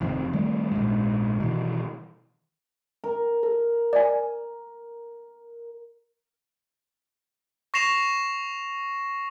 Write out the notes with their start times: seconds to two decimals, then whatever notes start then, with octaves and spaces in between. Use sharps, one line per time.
0.01 F1 F2 C3 D#3
0.33 D#3 G3 A3
0.71 A#1 G#2
1.40 B2 D#3 E3
3.04 A#4
3.43 A4
3.93 D5 G#5
7.74 C#6 A#6 C7 E7 F7